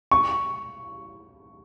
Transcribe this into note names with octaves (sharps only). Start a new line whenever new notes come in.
C#6